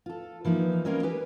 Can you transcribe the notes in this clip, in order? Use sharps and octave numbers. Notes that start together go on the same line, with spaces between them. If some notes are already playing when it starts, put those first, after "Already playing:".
F4 A4
E3 F3 A#3 D#4
G3 A#3 C4 C#4 A#4 D#5
G4 B4 G#5